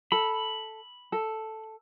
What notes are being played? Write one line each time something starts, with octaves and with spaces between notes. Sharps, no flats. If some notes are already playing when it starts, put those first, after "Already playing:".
A4 B5
A4